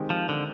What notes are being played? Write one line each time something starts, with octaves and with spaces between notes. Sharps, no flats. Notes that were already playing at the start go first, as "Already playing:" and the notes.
Already playing: D#3 G#3 C4 D#4 G4
F3
D3